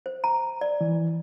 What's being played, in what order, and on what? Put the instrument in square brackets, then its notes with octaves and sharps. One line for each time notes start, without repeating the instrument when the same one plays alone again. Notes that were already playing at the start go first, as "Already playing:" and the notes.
[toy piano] C5
A#5
D5
[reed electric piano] E3